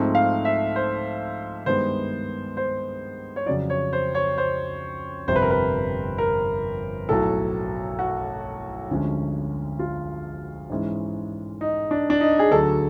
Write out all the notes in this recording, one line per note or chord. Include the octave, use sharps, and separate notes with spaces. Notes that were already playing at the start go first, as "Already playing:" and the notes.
Already playing: G#2 F3 A3 C4
F5
E5
C5
G2 D#3 G#3 B3 C5
C5
C#5
F2 C#3 F#3 D5
C#5
C5
C#5
C5
G1 F2 C3 C5
B4
A#4
B4
A#4
B1 A2 F#3 A4
F#4
D2 D3 F3 G#3 C#4
F4
G#2 E3 G#3 C#4
D#4
D4
D4
D#4
G#4
D2 D3 F#3 A4